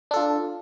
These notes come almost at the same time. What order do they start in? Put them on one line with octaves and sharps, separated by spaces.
D4 A4 F4